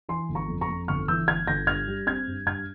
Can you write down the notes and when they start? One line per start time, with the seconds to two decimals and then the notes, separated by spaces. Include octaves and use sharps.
0.09 E3 G#5 C6
0.29 G1
0.35 A#5 C#6
0.48 F2
0.61 A#5 C#6
0.69 F2
0.88 G1 C#6 F6
1.08 E3 E6 G6
1.27 G1 F6 G#6
1.47 G1 G6 A#6
1.67 G2 F6 G#6
1.87 G3
2.06 C4 F6 G#6
2.27 G2
2.46 G2 F6 G#6